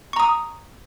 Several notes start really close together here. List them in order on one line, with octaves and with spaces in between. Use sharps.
C#6 A#5 D#6